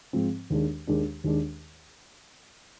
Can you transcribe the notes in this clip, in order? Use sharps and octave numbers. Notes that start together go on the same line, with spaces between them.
G#2 F3 C4
D#2 D#3 G#3 D4
D#2 D#3 G#3 D4
D#2 D#3 G#3 D4